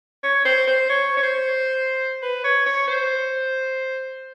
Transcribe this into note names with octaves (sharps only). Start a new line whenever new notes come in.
C#5
C5
C5
C#5
C#5
C5
B4
C#5
C#5
C5